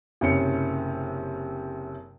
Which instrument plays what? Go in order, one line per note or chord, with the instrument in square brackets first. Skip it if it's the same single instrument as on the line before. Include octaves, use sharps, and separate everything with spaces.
[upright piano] F#1 C3 C#4 C#7